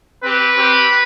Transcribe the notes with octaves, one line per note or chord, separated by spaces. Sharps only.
C4 G4 B4
C4 G4